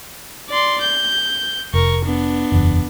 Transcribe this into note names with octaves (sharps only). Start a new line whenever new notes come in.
D5 C6
G6
F1 A#4 C#6
B3 D4
F#1 E2